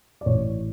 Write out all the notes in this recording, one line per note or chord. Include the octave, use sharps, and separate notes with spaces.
D5
A1 C#5